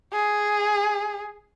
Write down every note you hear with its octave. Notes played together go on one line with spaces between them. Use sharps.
G#4